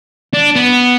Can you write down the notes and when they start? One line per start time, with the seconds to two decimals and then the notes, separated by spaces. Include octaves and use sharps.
0.34 D4
0.55 B3